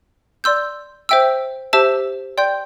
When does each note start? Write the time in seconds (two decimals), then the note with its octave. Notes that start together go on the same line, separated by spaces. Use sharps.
0.44 D5 C6 E6 G6
1.09 C5 E5 G5 E6
1.73 G4 C5 E5 A5 E6
2.38 D5 G5 C6 G6